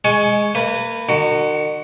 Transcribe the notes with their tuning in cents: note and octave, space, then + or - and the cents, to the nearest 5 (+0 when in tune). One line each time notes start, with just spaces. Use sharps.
G#3 +0 G#5 +20 C#6 +0
A#3 -30 B4 +0
D#3 -45 F#4 +10